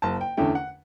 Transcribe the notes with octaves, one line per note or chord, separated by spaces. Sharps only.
F#1 A5
G5
E2 D3 A3 C#4 G5
F#5